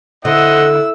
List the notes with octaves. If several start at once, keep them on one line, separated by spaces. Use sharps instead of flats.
D3 E4 C5 D#5 F#5 E6